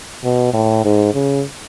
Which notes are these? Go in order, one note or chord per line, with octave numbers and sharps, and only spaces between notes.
B2
A2
G#2
C#3